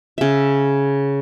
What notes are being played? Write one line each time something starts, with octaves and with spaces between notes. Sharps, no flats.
C#3 E5